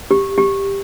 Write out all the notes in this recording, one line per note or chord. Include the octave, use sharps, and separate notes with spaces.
G4
G4